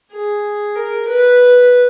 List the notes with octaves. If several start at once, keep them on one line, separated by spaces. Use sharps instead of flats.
G#4
A#4
B4